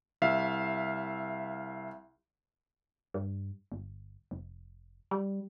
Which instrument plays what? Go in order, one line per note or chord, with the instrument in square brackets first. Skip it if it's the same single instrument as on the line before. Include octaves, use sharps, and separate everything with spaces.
[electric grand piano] C2 E5 F5
[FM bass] G2
G1
F1
G3